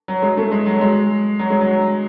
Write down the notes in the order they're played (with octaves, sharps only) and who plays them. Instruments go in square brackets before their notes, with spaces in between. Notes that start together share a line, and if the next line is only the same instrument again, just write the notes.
[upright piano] F#3
G#3
A3
G#3
F#3
G#3
F#3
G#3
F#3